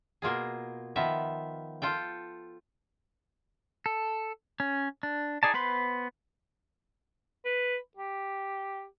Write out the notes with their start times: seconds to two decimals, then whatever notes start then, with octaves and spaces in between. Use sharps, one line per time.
0.22 B2 A#3 F4 G#4
0.96 D#3 F3 B3 E5
1.82 F4 A4 G5
3.86 A4
4.60 C#4
5.03 D4
5.43 D#4 G#4 D5 A5
5.54 B3 B4 C5 B5 C6
7.45 B4
7.97 G4